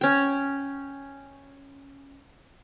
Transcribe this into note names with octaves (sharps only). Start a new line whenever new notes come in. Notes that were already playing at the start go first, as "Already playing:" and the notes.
C#4 G5